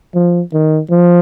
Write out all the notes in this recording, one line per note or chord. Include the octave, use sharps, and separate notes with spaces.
F3
D#3
F3